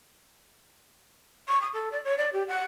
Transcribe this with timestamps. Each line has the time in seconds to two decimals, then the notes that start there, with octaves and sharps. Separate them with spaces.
1.48 C#6
1.61 D#6
1.73 A4
1.91 D5
2.04 C#5
2.17 D5
2.33 G4
2.48 F#5